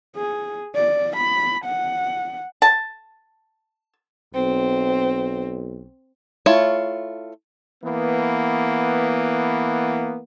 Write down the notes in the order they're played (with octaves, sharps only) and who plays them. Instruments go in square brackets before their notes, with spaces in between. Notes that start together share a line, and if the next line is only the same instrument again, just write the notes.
[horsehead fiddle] G#4
D5
B5
F#5
[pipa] A5
[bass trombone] B1 [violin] C4
[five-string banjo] A3 E4 F4 C#5
[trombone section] E3 A#3 B3